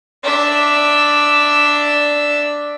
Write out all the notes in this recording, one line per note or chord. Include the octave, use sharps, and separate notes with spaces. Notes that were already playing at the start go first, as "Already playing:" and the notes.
D4 E5